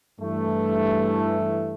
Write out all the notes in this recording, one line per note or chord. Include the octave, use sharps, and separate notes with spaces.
G2 E3 A3